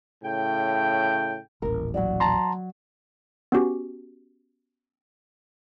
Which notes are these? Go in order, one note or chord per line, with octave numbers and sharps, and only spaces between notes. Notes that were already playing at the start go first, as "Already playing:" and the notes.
A2 C#3 G5
D#1 A1 A#4
F#3 F#4 D5
A5 A#5 C6
B3 C#4 F#4 G4